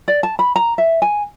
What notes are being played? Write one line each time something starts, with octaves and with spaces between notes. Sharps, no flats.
D5
A5
B5
A#5
E5
G#5